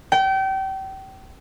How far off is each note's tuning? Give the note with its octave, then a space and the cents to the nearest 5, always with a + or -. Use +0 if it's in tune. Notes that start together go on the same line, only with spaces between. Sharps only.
G5 -30